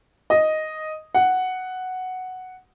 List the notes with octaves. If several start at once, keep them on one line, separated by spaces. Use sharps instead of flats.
D#5
F#5